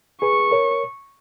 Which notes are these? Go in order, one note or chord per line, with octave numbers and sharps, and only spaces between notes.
G#4 B4 C#6
A#4 C#5